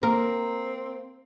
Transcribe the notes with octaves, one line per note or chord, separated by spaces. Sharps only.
A#3 C4 A#4